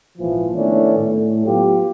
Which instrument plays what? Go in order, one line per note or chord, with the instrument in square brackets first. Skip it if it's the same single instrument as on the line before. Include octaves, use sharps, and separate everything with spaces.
[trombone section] G#1 A#2 E3 F3
D#3 A3 B3 C#4 D4 E4
A2
F#3 B3 F4 G4